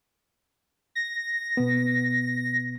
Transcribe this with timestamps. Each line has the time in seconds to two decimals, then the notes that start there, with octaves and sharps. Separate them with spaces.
0.95 A#6
1.57 B2 B3